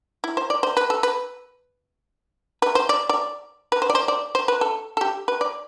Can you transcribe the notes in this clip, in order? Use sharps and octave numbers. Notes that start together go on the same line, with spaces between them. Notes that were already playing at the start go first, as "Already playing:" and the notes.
E4
C5
D5
C5
B4
A4
B4
B4
C5
D5
D5
B4
C5
D5
C5
D5
C5
B4
A4
A4
G4
B4
D5